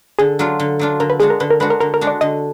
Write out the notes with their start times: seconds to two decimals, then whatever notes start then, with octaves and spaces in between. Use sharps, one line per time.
0.19 D3 G#4
0.39 F#3 D4 F4
0.59 D3
0.79 F#3 D4 F4
1.00 D3 A#4
1.10 B4
1.20 G#3 D4 F#4 G#4
1.30 A#4
1.40 D3 B4
1.50 A#4
1.60 G#3 D4 F#4 B4
1.70 A#4
1.81 D3 A#4
1.94 A#4
2.01 G#3 D4 F#4
2.07 D5
2.21 D3 D#5